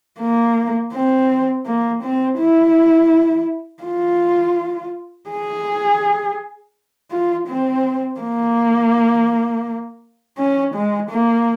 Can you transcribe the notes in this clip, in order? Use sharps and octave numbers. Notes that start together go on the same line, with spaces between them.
A#3
C4
A#3
C4
E4
F4
G#4
F4
C4
A#3
C#4
G#3
A#3